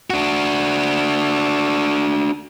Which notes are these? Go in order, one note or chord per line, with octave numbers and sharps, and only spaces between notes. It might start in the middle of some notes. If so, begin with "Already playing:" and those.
D4 F#4